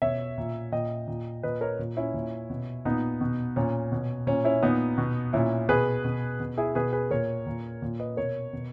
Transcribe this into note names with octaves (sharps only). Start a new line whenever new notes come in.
B2 C#5 E5
A#2
A#2 D#5 G5
A#2
A#2 B4 D#5
A#4 C#5
A#2
C#4 E4
A#2
B2
A#2 B3 D#4
B2
A#2 C#4
B2
A#2 C#4
C#4 E4
A#2 B3 D#4
B2
A#2 C#4 E4
B2 G#4 B4
B2
B2
E4 G#4
B2 G#4 B4
G#4 B4
A#2 A#4 C#5
A#2
A#2
B4 D#5
B2 A#4 C#5
B2